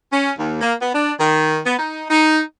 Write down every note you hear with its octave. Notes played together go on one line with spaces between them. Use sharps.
C#4
D#2
A#3
B3
D4
D#3
B3
D#4
D#4